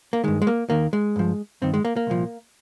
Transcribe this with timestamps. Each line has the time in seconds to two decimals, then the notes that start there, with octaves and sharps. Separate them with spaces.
0.13 A#3
0.24 G2 D#3 G#3
0.42 G#3
0.47 A#3
0.70 D#2 D#3 A#3
0.93 G#3
1.16 G2 F3
1.62 G2 D#3 C4
1.74 G#3
1.85 A#3
1.96 A#3
2.07 C2 A#2 F3